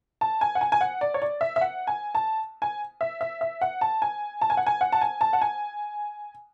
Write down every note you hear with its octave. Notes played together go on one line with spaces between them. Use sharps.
A5
G#5
F#5
G#5
G#5
F#5
D5
C#5
D5
E5
E5
F#5
G#5
A5
G#5
E5
E5
E5
F#5
A5
G#5
A5
G#5
F#5
G#5
F#5
A5
G#5
A5
F#5
G#5